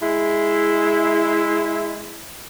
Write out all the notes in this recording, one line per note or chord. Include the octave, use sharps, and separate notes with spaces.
G#3 E4